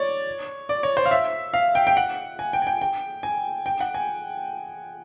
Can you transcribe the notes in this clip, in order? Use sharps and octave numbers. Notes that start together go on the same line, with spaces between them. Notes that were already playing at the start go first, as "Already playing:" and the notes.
Already playing: C#5 D5
D5
C#5
C5
F5
E5
F5
G5
G5
F#5
G#5
G5
G#5
G5
G5
G#5
G5
F#5
G#5